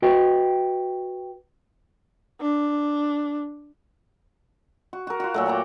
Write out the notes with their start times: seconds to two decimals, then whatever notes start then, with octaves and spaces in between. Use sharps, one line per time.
0.02 F#4 B4 D#5 G5
2.41 D4
4.93 F#4
5.07 F#4 A#4
5.20 F4 F#4
5.34 A#2 F#3 A3
5.46 F#5 G5 A#5 D6